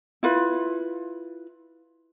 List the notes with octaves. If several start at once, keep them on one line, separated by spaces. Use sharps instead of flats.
E4 F4 B4